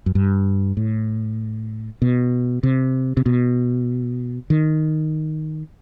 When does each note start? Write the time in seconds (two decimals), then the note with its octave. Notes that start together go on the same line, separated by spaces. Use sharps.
0.06 F#2
0.15 G2
0.77 A2
2.02 B2
2.63 C3
3.17 C3
3.26 B2
4.50 D#3